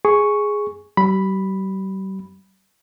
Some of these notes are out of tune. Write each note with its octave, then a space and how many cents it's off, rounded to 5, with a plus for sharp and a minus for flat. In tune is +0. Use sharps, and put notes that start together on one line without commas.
G#4 +0 C#6 +0
G3 -40 B5 +0